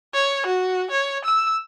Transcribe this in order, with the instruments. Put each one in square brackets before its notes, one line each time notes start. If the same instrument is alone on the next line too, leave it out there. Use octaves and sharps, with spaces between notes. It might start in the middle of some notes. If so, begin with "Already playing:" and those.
[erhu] C#5
F#4
C#5
E6